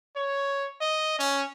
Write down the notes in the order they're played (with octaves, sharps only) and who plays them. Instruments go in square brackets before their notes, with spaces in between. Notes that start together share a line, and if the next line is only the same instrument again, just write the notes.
[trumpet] C#5
D#5
C#4